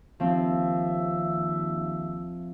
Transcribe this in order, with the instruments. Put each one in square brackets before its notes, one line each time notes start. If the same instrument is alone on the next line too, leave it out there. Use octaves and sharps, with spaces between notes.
[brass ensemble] D#2 E5 [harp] F3 C4